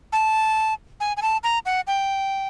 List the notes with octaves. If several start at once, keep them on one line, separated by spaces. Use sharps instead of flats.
A5
G#5
G#5
A5
A#5
F#5
G5